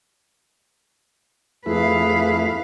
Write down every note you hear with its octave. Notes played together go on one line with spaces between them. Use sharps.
F2 A3 E4 G#4 B4 F5